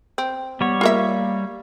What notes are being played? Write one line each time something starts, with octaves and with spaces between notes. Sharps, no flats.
C4
G3 B3 C#5
A#3 F4 A#4 E5